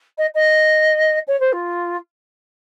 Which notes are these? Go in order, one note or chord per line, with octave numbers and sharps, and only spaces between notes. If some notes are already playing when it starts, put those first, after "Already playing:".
D#5
D#5
C#5
C5
F4